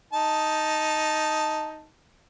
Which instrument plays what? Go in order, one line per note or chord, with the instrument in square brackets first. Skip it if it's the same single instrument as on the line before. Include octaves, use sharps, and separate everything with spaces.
[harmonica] D#4 A5